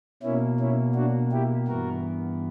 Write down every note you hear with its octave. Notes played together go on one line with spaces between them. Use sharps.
B2 A#3 C#4 E4
C#4 E4
D4 F#4
E4 G4
G2 E3 B3 F#4 A#4